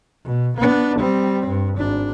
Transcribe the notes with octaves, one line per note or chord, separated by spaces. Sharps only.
B2
B3 D4
G3 C4
G2
G#1 D4